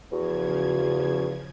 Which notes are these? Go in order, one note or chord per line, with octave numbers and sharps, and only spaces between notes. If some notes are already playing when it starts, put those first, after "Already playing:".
E2 C#3 F3 F#4 G#6